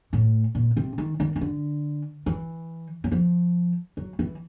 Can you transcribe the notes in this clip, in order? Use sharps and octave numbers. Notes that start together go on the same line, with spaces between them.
A2
A#2
C3
D#3
D#3
D#3
D3
E3
F#3
F3
F#3
E3